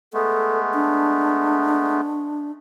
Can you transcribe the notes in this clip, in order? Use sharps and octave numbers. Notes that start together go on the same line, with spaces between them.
G#3 A3 B3 A4
D4